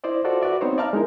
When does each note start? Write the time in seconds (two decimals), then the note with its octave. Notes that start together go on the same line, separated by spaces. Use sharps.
0.04 E4 C5 D5 D#5
0.24 F4 F#4 A4 C5 D5
0.41 F#4 B4 D5 E5
0.61 B3 C4 D#4 C5 C#5
0.78 D5 E5 F5 A5 A#5 F6
0.93 G#3 D#4 E4 A#4